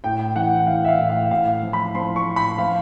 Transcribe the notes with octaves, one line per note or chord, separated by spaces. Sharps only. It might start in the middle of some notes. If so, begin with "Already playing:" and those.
A2 G5
E3 F#5
E3 F5
E5
F5
A2
F5
A2 F5
F3
B5
F3 C6
C#6
A2
B5
F3 F5